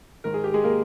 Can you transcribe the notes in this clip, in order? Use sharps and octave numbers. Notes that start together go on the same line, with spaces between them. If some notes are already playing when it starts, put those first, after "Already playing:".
G#2 D#3 A#4
G#4
G4
G#3 G#4
A#3 A#4